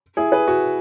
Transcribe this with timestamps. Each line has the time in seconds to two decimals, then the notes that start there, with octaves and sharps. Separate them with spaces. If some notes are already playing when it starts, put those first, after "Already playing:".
0.17 E4 G#4
0.32 G#4 B4
0.48 F#4